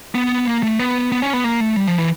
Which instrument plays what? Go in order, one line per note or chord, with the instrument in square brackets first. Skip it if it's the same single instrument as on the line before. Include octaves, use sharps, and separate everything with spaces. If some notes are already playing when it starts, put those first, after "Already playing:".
[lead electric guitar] B3
A#3
A3
B3
B3
C#4
B3
A#3
A3
G3
F3
E3